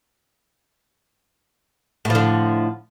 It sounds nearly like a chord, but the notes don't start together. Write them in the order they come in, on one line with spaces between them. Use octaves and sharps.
A2 F3 D3